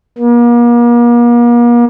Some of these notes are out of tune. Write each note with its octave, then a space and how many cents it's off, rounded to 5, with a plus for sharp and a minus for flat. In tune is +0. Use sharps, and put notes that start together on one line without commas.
A#3 +40